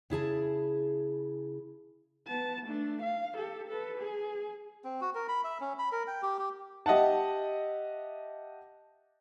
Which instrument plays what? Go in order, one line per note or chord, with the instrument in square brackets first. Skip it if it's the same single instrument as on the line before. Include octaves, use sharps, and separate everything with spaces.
[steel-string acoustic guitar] C#3 E4 G#4 A5
[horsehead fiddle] B3 A5
A3 D4
F5
G4 A4
A4 B4
G#4
[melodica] C4
F#4
A#4
B5
E5
C#4
B5
A#4
G5
G4
G4
[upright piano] G4 D#5 E5 F#5 A5